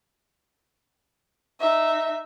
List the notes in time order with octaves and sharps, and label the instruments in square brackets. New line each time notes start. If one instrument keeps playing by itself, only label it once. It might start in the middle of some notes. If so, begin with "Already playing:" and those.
[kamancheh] D#4 E5